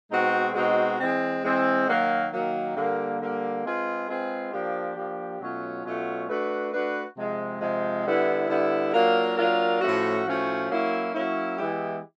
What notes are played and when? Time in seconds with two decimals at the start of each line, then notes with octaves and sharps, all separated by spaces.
0.11 B2 G#3 C4 D#4 F#4
0.54 B2 G#3 C4 D#4 F#4
0.99 E3 G#3 C4
1.43 E3 G#3 C4
1.87 D#3 F#3 A#3
2.31 D#3 F#3 A#3
2.75 D3 G3 A#3
3.20 D3 G3 A#3
3.64 G#3 C4 F4 G#4 B4
4.07 G#3 C4 F4 G#4 B4
4.52 F3 A#3 D4 G4
4.96 F3 A#3 D4 G4
5.40 B2 F#3 A3 C#4 F4
5.84 B2 F#3 A3 C#4 F4
6.29 A3 D4 F#4 B4
6.73 A3 D4 F#4 B4
7.17 C3 F3 G#3
7.60 C3 F3 G#3
8.05 D3 G3 B3 E4
8.48 D3 G3 B3 E4
8.93 F#3 A#3 D4 F4 A#4
9.36 F#3 A#3 D4 F4 A#4
9.81 A2 F3 A3 C#4 F#4
10.26 A2 F3 A3 C#4 F#4
10.69 F#3 A#3 C#4 E4
11.13 F#3 A#3 C#4 E4
11.58 E3 G#3 B3 E4 G4